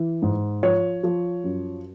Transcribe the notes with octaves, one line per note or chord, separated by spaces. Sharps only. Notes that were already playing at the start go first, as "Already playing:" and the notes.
Already playing: E3
G#2
F3 C#5
F3
F#2